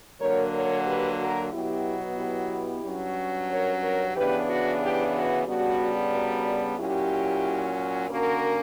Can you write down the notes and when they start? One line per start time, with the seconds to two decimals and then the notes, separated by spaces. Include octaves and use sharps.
0.20 D3 F#3 A#3 A#4 C#5
0.54 A#4 C#5
0.86 G4 B4
1.19 F#4 A#4
1.52 B2 F#3 B3 E4 G4
2.18 E4 G4
2.84 G2 F#3 C#4
3.49 A#4 C#5
3.82 A#4 C#5
4.15 C#3 E3 B3 D4 G4 B4
4.48 F#4
4.81 E4 G4
5.14 F#4
5.47 C#3 G3 B3 D4 F#4
6.12 F#4 A#4
6.78 A#2 F#3 C#4 E4 G4
8.10 D3 A#3 C#4 F#4 A#4